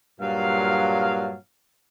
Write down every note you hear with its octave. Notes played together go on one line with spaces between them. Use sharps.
G2 A#2 F#3 F5